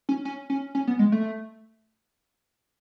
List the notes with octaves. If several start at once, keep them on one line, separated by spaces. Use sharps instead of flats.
C#4
C#4
C#4
C#4
B3
G#3
A3